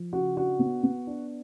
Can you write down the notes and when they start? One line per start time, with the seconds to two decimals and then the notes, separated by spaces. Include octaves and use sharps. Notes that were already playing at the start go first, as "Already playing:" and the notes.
Already playing: F3
0.13 C#3 F#4
0.36 D4 F#4
0.59 B3
0.83 B3
1.07 D4